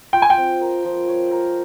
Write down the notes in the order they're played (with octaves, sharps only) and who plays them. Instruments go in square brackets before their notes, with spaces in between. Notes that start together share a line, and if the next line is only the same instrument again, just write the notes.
[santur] F4 [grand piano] G5
[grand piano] G#5
G5
[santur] C4
A#4
F3
C#5
A#4